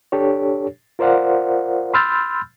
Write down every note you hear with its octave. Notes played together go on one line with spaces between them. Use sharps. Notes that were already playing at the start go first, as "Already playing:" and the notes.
D4 G4 A4 C#5
F4 A#4 C5 D5 F5 F#5
B5 C6 E6 F6 G6 A6